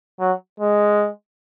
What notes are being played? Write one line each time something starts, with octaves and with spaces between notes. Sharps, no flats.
F#3
G#3